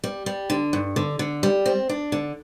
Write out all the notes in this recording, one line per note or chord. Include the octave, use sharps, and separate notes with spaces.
G3
G3
D3
G2
D3
D3
G3
C4
D4
D3